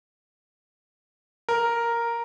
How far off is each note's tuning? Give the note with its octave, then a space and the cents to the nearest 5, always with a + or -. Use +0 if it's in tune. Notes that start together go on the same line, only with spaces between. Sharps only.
A#4 +0